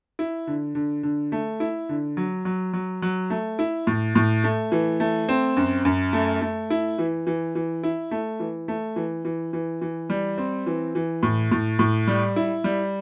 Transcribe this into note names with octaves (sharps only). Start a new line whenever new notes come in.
E4
D3
D3
D3
A3
E4
D3
F#3
F#3
F#3
F#3
A3
E4
A2
A2
A3
E3
A3
C4
F#2
F#2
A3
A3
E4
E3
E3
E3
E4
A3
E3
A3
E3
E3
E3
E3
G3
C4
E3
E3
A2
A2
A2
G3
E4
G3